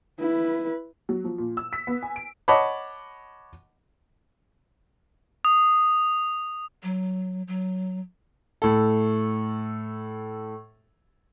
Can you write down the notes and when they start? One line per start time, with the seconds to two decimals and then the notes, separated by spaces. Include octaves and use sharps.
0.19 E4 B4
1.09 F#3
1.24 F3
1.38 A#2
1.57 E6
1.73 B6
1.87 B3
2.03 G#5
2.16 D7
2.48 C#5 D#5 F#5 A5 B5 D6
5.45 D#6
6.83 F#3
7.48 F#3
8.62 A2 A4